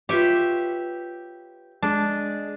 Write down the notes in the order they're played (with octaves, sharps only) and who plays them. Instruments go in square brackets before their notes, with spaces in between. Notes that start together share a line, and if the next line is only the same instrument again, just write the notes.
[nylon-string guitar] F4 B4 C#5 [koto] G4 E5
[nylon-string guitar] G#3 [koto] D4